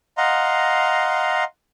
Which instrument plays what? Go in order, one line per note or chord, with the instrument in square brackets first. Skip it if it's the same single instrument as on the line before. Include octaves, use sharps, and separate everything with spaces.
[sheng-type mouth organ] D#5 F5 F#5 A#5 C6